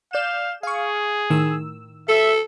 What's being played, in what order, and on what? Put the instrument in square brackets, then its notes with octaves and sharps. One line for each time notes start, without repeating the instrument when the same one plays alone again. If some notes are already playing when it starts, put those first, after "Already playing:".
[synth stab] D5 G6 E7 [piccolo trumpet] F5
[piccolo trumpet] G#4 [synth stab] F5 C#6
[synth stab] A2 D#3 E6
[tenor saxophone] A4 [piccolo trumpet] E5